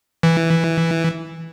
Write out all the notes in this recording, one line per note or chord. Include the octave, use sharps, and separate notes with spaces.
E3